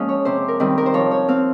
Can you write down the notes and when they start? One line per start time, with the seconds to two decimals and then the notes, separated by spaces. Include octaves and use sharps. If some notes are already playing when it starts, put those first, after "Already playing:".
Already playing: F3 G#3 A#3 C#4 D#5 F5
0.09 C#5
0.25 C3 C5
0.48 A#4
0.60 D#3 G3 C4
0.78 A#4
0.86 C5
0.94 F3 C#5
1.11 C#5
1.29 C4 F5